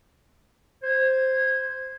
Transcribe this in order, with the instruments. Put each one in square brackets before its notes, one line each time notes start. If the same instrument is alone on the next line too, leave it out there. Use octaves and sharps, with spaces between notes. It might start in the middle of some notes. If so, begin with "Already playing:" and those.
[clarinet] C5 [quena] G#6